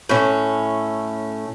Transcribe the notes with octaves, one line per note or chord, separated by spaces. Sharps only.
A2 C#4